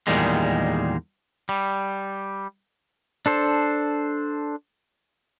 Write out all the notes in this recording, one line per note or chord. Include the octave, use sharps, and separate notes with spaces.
E2 A#2 D#3 G3 G#3
G3
D4 A4 C5